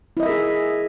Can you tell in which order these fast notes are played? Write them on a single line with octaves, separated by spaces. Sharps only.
E4 D#5 E5 A#4 G#4